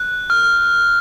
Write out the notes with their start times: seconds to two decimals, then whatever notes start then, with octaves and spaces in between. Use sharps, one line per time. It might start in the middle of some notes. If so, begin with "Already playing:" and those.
Already playing: F#6
0.30 F6